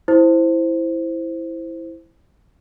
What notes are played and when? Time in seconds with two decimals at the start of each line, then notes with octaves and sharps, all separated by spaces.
0.08 E4 C5